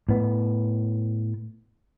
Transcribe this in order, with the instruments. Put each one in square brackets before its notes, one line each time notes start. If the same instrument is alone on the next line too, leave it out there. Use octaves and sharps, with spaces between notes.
[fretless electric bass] A2 B3